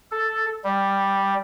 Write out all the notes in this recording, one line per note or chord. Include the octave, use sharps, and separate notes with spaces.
A4
G3